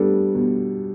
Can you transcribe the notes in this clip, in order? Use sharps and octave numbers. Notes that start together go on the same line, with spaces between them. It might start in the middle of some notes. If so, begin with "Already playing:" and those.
Already playing: G3 B3 D4 A4
B2